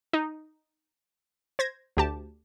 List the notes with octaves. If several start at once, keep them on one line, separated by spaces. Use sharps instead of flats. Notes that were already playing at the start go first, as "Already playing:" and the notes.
D#4
C5 G#6 A#6
D2 G4 A5